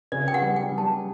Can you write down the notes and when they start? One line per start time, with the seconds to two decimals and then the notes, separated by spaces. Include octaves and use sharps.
0.12 C#3 D5
0.28 G5
0.34 F#5
0.42 G3
0.56 G5
0.71 G3
0.78 A5